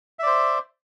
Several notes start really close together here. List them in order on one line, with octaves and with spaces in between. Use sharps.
E5 D5 C5